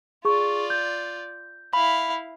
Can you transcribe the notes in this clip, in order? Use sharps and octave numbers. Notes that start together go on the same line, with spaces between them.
F4 G#4 D5 C#6
G6
E4 F5 B5